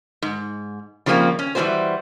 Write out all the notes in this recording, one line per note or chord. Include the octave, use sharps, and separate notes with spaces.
G#2
C#3 F3 G3 A3 A#3 C4
C#4
E3 G3 C4 D4 F#4 C5